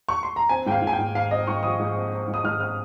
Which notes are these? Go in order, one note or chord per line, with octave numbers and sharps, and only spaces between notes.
C#6
C6
A#5
C4 G#5
G#2 G5
F5
G#2
G#5
G5
G#2
G#2 F5
C4 D#5
G#2 C#6
F3 D#6
G#2
C4
C4
G#2
D#6
G#2 F6
C4 F6